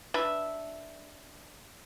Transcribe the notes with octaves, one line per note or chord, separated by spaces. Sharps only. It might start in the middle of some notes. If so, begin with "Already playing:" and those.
D4 B4 E5